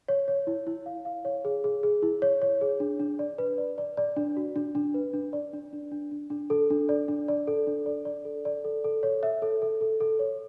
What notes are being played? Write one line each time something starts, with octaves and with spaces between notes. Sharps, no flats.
C#5
C#5
E4
E4
F5
F5
C#5
G#4
G#4
G#4
E4
C#5
C#5
G#4
D4
D4
D5
B4
D5
D5
D5
D4
F#4
D4
D4
B4
D4
D5
D4
D4
D4
D4
D4
A4
D4
D5
D4
D5
A4
D4
D5
D5
A4
D5
A4
A4
C#5
E5
A4
A4
A4
A4
C#5